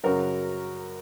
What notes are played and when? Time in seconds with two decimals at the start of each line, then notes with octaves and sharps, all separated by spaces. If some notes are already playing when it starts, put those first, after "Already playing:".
0.04 F#2 C#3 F#3 F#4 A#4